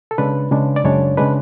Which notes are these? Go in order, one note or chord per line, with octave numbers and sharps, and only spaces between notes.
A4
C#3 G#3 D4 B4
C#3 G#3 D4
D5
F#2 C#3 G#3 D4 C#5
C#3 G#3 D4 B4